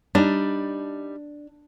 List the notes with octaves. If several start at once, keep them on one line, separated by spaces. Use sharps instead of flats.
G3 D4 D#4